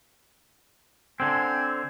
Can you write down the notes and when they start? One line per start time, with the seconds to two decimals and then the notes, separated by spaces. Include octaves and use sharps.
1.20 D3 C4 G#5